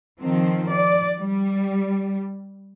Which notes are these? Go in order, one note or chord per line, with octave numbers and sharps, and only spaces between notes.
D#3 F3 C4
D5
G3